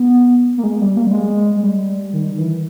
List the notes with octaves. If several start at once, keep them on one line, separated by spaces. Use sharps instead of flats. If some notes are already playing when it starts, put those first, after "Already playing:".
Already playing: B3
A#3
G#3
G3
A#3
G3
G#3
G#3
G3
D#3
E3